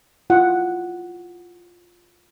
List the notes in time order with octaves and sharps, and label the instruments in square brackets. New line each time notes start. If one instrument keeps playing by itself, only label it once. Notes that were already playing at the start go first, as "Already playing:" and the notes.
[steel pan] E4 F4 F#5